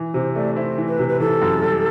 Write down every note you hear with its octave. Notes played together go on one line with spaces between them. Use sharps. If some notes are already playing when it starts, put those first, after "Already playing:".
Already playing: E3
C3 C5
A3 D5
E4 C5
E3
B4
C3
B4
E3 A4
F#2
G3